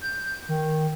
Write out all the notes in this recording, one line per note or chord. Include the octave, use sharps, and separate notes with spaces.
G6
D#3